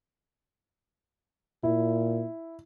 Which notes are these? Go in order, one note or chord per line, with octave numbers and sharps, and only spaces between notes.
A#2 E4